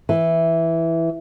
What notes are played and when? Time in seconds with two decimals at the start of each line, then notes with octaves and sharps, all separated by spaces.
0.09 E3